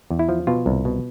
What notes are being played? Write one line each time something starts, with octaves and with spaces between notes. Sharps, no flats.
E2
E4
F3
B2 F4
C2
B2